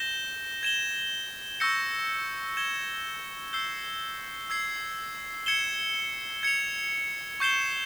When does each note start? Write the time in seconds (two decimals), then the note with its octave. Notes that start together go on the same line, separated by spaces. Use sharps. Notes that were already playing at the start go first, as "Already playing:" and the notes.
Already playing: G6 A#6 E7 G7
0.63 G#6 E7 G7
1.60 C#6 E6 G6 A#6 C#7
2.57 G#6 E7 G7
3.53 E6 G6 C7 G7
4.50 E6 G#6 C7
5.46 G#6 C#7 E7 G7
6.43 G#6 C#7 F7
7.40 C#6 G6 C7 E7 G7